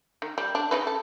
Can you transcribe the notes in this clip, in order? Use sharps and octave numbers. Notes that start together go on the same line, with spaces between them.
D#3
G3
D4
C#3 D#4 B4
A4